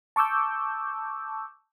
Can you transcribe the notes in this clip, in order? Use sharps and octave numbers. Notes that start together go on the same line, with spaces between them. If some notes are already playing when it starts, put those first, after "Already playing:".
A5 C#6 D6 E6 G6